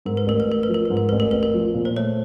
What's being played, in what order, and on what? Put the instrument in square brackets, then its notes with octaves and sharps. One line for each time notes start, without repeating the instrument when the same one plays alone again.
[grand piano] G#2 [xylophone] A#4
[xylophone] B4
[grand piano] A1 [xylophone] A#4
[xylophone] B4
[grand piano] A1 [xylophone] A#4
[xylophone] B4
[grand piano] F3
[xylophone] A#4
[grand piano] G#2 [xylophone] B4
[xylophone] A#4
[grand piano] A1 [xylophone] B4
[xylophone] A#4
[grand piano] A1 [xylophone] B4
[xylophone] A#4
[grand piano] F3
A#2
[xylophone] C5
[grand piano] A3 [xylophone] C#5